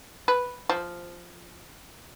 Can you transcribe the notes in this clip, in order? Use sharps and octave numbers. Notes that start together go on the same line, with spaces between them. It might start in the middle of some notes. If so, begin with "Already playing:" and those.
B4
F3